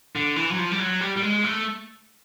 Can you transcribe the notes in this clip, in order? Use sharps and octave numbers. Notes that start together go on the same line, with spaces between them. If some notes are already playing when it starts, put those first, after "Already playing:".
D3
E3
F#3
F3
G3
F#3
G3
G3
G#3
A3